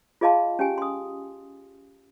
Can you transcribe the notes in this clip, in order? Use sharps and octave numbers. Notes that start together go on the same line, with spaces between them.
F4 G#4 D#5 F5 A5 C6
C#4 G4 G#5
C6 D#6